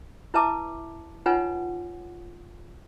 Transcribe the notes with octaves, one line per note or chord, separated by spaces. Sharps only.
E4 B4 E5 A5 D6
D#4 F4 B4 C#5 F#5 G#5